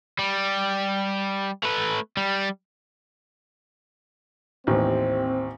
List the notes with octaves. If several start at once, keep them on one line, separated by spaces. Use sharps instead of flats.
G3
A3 B4
G3
A1 D#2 C4